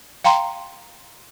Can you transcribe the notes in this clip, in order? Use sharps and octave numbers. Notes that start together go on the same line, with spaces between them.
F5 G5 A#5 C6